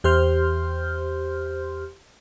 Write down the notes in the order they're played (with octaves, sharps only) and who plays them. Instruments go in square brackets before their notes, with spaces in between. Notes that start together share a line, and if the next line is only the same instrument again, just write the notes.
[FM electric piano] E2 G4 C5 C6 F6 G6